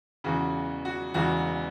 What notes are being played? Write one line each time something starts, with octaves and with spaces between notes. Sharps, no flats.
E1 E2 C#3 F#4
F#4
E1 E2 C#3 F#4